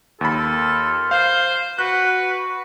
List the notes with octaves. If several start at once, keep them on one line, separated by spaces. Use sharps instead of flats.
D#2 F4 A4 B5
C5 F5
F#4 B4 F#6